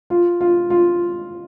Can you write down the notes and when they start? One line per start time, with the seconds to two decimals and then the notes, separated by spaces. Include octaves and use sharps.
0.10 F4
0.41 F4
0.70 F4